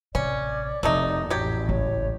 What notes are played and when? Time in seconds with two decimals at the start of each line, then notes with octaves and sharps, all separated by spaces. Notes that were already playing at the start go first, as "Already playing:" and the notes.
0.15 A1 C3 C#4 D5
0.83 F1 F2 F#3 A3 D#4
1.30 A1 F#3 G4
1.69 G#1 C#2 C#5